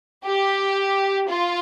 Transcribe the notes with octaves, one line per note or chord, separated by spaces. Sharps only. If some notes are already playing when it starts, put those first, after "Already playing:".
G4
F4